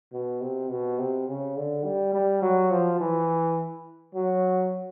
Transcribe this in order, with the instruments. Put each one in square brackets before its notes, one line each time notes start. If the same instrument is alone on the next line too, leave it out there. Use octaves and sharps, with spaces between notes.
[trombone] B2
C3
B2
C3
C#3
D3
G3
G3
F#3
F3
E3
F#3